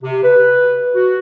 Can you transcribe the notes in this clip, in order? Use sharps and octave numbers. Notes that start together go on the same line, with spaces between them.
C3
B4
F#4